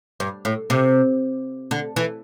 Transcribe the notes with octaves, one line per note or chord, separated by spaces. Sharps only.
G2
A2
C3
D3
E3